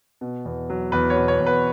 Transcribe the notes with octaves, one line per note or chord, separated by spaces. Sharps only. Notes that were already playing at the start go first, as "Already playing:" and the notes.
B2
E2
F#3
E2 B4
C#5
B2
C#5
E2
B4